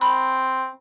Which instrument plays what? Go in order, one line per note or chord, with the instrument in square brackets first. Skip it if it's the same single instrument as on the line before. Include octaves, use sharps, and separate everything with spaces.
[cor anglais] C4 [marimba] B5